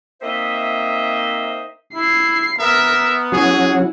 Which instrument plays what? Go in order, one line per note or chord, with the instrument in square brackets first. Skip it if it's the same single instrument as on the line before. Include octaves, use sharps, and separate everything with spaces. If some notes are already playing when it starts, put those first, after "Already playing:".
[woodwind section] A#3 C4 D#4 C5 D#5 E5
[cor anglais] E4 [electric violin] C7
[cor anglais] B3 [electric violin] A#4 [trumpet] E5
[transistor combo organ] F#3 C#4 F#4 [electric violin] E4 [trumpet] G#4